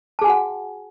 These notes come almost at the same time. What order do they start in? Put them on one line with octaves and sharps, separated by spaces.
A5 G#4 G#5 F#4 F#5